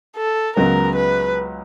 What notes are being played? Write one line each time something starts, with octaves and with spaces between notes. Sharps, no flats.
A4
C#2 C#3 F#3 B3 A#4
B4